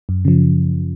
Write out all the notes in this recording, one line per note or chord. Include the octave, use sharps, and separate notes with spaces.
F#2
C#3 F3